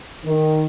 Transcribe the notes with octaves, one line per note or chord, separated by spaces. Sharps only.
D#3